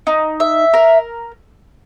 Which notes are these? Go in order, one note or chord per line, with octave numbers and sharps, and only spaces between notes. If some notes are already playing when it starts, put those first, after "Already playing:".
D#4
E5
A#4